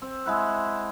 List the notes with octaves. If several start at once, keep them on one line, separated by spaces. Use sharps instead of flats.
C4
G#3 E4 F#5